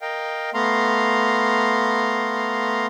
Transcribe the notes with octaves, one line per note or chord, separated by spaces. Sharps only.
A#4 D#5 F5 G5
A3 B3 F5 A#5 C6